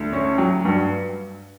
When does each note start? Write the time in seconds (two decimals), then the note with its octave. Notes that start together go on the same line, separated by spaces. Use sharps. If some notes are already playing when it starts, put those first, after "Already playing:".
Already playing: D2
0.13 C#4
0.38 F#3
0.65 G2